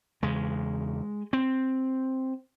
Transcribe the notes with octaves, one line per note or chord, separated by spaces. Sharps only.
E2 C#3 G#3
C4